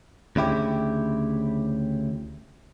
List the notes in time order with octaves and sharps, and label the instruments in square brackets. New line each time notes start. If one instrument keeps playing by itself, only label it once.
[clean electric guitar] D2 C#3 E4 G4